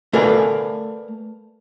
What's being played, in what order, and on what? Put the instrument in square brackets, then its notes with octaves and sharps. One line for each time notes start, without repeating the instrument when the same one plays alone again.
[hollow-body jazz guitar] A3 A#4 B4 D5 F5 G#5